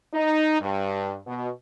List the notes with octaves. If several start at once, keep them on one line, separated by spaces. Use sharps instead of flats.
D#4
G2
B2